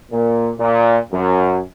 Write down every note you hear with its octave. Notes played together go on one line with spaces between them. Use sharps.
A#2
A#2
F#2